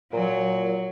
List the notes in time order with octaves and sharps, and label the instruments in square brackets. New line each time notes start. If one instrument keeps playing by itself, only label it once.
[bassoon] A#2 [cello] F#3